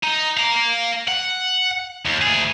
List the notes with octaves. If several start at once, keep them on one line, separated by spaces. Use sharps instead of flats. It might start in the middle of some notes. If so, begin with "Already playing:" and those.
D#4
F5 A#5
F#5
D#2
D2 G#4